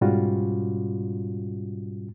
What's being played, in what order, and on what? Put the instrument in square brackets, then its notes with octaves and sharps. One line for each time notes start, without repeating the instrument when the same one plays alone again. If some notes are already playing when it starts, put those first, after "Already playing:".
[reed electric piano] G#2 B2 G3 C#4 F4 F#4